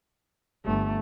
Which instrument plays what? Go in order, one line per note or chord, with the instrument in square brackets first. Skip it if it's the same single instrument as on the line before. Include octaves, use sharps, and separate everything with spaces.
[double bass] G1 [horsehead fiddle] A3